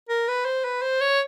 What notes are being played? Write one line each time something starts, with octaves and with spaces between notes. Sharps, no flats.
A#4
B4
C5
B4
C5
C#5